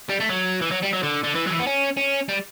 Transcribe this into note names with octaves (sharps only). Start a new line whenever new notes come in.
G3
A3
F#3
E3
F#3
G3
F#3
D3
D3
E3
F#3
E3
B3
C#4
C#4
G3